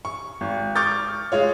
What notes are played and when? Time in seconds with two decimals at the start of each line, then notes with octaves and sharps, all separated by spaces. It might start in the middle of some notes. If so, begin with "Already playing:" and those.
0.05 C#6
0.41 G#1
0.76 C#6 D6 F6 G6 A6
1.32 G#3 F4 C#5